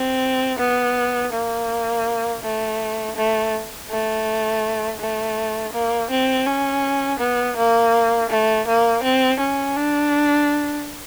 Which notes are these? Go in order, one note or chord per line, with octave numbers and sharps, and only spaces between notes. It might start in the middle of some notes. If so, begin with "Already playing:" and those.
Already playing: C4
B3
A#3
A3
A3
A3
A3
A#3
C4
C#4
B3
A#3
A3
A#3
C4
C#4
D4